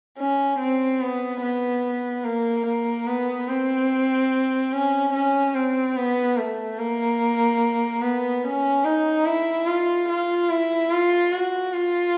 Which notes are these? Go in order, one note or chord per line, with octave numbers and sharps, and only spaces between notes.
C#4
C4
B3
B3
A#3
A#3
B3
C4
C#4
C#4
C4
B3
A3
A#3
B3
C#4
D#4
E4
F4
F4
E4
F4
F#4
F4